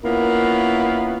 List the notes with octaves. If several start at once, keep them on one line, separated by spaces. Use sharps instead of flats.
A#3 B3 C#4 E4 F4 A#4